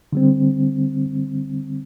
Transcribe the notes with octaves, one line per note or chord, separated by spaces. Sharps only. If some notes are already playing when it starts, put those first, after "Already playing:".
D3 G3 C4